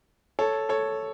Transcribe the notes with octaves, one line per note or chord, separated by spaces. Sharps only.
A4 C#5
A4 C#5